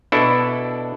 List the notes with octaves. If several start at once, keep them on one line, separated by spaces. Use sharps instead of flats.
B2 D4 E4 A4